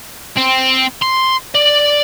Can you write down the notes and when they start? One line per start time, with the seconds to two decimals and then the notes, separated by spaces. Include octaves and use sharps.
0.37 C4
1.02 C6
1.55 D5